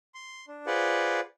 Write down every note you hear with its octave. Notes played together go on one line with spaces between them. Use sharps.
C6
D4
F4 G#4 B4 C5 D5 F#5